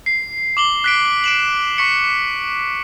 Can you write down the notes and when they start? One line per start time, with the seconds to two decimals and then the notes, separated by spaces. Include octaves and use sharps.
0.06 C7
0.57 D6 F#7 G7
0.84 F#6 B6 D7
1.24 D7 E7 F#7
1.78 C#6 B6 C#7